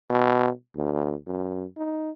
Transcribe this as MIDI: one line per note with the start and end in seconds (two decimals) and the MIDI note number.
0.10 0.50 47
0.75 1.15 38
1.27 1.65 42
1.77 2.11 63